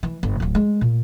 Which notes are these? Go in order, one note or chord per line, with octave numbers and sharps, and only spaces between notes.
E3
G1
D1 D2
G#3
A#2